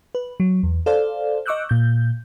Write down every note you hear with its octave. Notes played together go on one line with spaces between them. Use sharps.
B4
F#3
E2
A4 C5 D5 F5
D#5 C#6 D6 E6 F#6 G6
A#2 G6